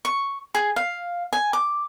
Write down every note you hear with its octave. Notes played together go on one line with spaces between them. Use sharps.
C#6
G#4
F5
G#5
D6